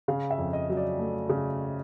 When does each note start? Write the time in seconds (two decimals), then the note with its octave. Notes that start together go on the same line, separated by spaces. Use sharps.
0.08 C#3 F5
0.30 E5
0.38 F2
0.53 D#5
0.70 F#3
0.77 D5
0.99 A3
1.29 C#3